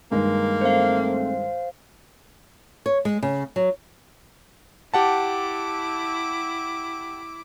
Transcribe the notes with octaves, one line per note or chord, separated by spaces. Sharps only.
G2 D#3 G#3 A#3
A3 C4 C5 F5
C#5
G#3
C#3
F#3
E4 G4 F#5 A5 D6